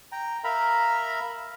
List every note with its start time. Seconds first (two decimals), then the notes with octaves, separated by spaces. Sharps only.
0.12 G5 A#5
0.44 A#4 E5 F5 A#5 B5